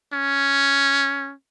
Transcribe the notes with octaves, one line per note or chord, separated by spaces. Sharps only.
C#4